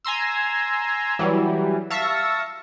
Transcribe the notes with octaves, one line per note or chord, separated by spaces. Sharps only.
G#5 A#5 C6 E6
E3 F#3 G3
E5 F5 A5 C#6 A#6